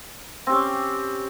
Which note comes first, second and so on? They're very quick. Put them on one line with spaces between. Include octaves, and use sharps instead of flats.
C4 G4 C#4